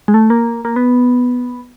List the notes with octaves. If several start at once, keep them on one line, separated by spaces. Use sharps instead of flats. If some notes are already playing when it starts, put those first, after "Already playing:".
G#3
A3
A#3
A#3
B3